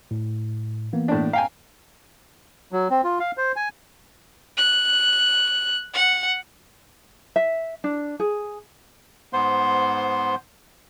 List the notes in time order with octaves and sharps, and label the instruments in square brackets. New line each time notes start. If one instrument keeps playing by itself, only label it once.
[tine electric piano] A2
E3 A#3 B3
[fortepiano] A2 D4
[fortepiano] F5 G5 G#5 [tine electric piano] A#5
[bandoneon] F#3
C4
F4
F5
C5
G#5
[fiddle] F#6
F#5
[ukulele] E5
D4
G#4
[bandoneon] G#2 B3 C5 C6